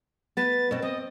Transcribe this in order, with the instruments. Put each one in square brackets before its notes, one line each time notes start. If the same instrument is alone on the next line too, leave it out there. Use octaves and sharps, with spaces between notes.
[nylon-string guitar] B3 B4 [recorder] A6
[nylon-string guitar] B2 C4
[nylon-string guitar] C4 [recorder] D#5